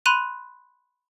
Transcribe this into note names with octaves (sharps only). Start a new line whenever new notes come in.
B5 C6 F#6 D#7 F7